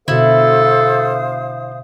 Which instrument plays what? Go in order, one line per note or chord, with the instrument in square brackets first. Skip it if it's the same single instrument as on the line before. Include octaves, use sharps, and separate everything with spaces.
[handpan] B2 D3 [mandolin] E4 [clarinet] A4 [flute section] C5 F5 D#6